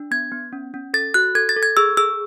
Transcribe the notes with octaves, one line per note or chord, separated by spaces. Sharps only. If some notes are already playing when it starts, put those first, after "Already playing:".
Already playing: D4
B3 G#6
B3
C#4
C#4
A4 A6
F#4 F#6
A4 G#6
A6
A4
G#6
G#4 E6
G#4 E6